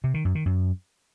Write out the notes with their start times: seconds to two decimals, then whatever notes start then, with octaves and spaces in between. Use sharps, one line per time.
0.04 C3
0.14 D#3
0.25 F#2
0.35 D#3
0.46 F#2